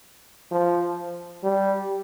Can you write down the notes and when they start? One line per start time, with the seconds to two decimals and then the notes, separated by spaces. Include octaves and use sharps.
0.51 F3
1.43 G3